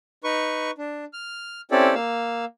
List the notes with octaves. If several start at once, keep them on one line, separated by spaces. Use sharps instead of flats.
D#4 B4 C#6
D4
F6
C4 C#4 E4 G4 A4 D5
A#3 F5 E6